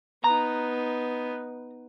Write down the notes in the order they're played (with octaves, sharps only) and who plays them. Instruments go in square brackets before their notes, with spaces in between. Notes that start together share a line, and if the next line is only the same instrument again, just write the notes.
[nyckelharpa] B3 D#4 [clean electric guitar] A#5